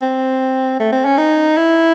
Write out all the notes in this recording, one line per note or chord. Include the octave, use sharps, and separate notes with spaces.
C4
A3
C4
C#4
D#4
E4